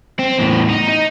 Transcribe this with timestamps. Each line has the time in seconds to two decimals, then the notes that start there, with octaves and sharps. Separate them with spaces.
0.19 C4
0.39 E2 A2
0.69 D#4
0.88 D#4